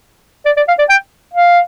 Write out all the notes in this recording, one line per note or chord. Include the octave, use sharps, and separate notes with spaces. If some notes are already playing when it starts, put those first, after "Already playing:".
D5
D5
F5
D5
G5
F5